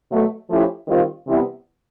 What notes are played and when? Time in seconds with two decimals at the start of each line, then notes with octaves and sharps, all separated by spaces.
0.10 B2 F#3 A3
0.49 F3 A3 C#4 E4 G4
0.88 D#3 G3 C4 F4
1.27 C3 E3 G3 B3 E4